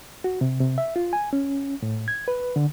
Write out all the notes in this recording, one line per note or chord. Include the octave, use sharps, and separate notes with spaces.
F#4
C3
C3
E5
F4
G#5
C#4
A2
G#6
B4
D3